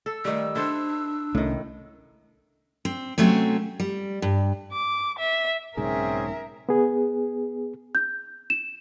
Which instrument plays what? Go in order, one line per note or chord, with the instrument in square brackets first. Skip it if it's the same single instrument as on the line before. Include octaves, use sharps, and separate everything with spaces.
[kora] A4 [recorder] E6
[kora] D#3 G3 [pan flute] A3
[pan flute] D4 [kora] E4 A4 C5
[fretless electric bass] C2 A3 C#4 [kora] A2 D#3
[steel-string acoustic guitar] C4
C3 F#3 A3 C4 C#4
G3
G2
[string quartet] D6
E5
[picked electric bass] B1 G#2 C#3 [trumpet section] C4 C#4 G#4 [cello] A#4 E5
[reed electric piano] B3 G#4
[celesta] G6
E7